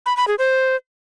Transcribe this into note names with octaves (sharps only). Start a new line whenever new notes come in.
B5
B5
G#4
C5